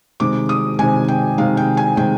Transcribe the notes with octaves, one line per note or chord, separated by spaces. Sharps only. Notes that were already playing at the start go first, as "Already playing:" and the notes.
C3 D#3 G#3 D6
D#6
C3 D#3 G#3 G#5
G5
C3 D#3 G#3 F5
G5
G#5
C3 D#3 G#3 G5